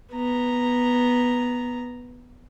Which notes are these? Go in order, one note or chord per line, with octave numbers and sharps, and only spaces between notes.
B3 A#5